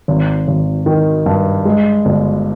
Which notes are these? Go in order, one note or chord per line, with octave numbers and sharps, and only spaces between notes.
G#1
G#1
D#3
G2
G#3
G1